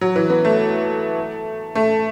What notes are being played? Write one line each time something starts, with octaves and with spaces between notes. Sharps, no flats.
F#3
E3
B3
A3
A3